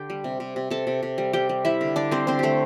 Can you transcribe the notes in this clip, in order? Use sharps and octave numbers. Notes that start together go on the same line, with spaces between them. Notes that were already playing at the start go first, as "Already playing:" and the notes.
Already playing: D3 G4 G5
G3
C3
C3
C3
C3 A4 A5
C3
C3
G3
G3 G4 G5
G3
G3 E4 E5
D3
D3 D4 D5
G3 C4 C5
D3 C4 C5
D3 A3 G4 A4